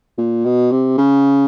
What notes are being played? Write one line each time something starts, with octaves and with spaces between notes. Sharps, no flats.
A#2
B2
C3
C#3